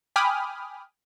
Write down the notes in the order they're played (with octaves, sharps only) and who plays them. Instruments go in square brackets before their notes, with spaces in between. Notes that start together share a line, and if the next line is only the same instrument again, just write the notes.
[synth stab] G5 G#5 B5 D6 D#6 F6